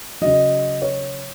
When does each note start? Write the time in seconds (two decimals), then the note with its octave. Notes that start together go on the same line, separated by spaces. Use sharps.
0.21 C#3 F#3 D#5
0.82 C#5